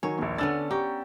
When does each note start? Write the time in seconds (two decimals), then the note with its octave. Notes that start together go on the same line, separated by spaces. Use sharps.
0.03 D#3 F#3 C#5 G#5
0.18 A#1 D#2
0.38 D3 B3 C#4 D4 E6 A6
0.71 G4 A#5 C#6